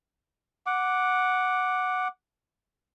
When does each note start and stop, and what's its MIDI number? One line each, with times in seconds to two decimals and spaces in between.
0.66 2.08 78
0.66 2.08 86